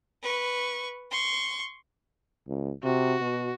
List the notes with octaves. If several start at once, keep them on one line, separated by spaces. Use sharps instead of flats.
B4 C#6
C6 C#6
C#2
C3 F#4
B2